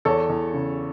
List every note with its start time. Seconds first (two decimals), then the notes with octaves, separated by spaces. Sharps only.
0.05 E2 A4 C#5
0.29 E2
0.54 C#3